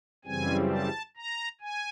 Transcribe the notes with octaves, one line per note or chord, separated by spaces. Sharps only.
F#2 C#3 E3 G3 C4 G#5
A5
A#5
G#5